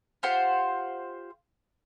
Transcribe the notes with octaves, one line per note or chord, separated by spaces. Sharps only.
F4 G4 C5 F#5